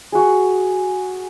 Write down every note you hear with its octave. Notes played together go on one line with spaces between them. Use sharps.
F#4 G#4